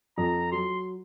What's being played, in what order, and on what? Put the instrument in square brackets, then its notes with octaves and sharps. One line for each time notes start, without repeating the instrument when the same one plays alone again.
[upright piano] F2 [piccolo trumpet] A#5
[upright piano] F#3 [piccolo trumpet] C6